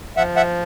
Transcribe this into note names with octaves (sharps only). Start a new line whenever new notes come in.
F3 E5 F#5
E5 F#5